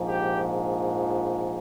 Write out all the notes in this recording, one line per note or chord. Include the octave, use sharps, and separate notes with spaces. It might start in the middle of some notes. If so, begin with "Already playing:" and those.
Already playing: A#1 G#2 F3
G4